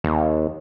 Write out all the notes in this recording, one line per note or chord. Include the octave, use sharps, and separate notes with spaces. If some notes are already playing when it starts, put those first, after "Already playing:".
D#2